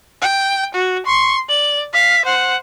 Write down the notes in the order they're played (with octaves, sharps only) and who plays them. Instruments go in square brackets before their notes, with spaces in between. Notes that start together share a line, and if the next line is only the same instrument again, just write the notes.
[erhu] G5
F#4
[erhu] C6 [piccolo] C#6
[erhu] D5 [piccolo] F#7
[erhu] F5 [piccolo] B6
[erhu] C5 [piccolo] F#5